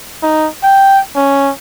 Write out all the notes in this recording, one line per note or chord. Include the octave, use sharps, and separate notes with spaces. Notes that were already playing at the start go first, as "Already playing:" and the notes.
D#4
G5
C#4